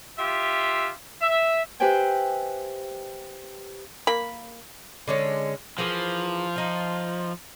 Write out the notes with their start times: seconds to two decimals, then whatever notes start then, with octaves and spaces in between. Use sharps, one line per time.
0.19 F4 G4 E5
1.22 E5
1.80 G4 B4 C5 E5 G5 G#5
4.07 A#3 B5
5.07 D3 G#3 C#4
5.78 E3 F3 G#4 A#4
6.56 D#4 F4